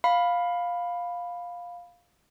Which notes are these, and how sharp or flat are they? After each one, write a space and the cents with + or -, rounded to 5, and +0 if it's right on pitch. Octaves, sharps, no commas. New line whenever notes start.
F5 +10 B5 +0